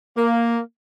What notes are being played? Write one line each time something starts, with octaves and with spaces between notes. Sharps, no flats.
A#3